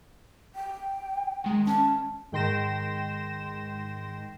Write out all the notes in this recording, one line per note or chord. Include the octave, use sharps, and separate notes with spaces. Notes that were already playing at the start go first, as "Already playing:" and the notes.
G5
D#3 G#3
C#4 A5
G#2 D#3 G5 C6 A#6 E7